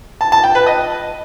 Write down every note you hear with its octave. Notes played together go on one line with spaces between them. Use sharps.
A5
A5
G5
B4
D#5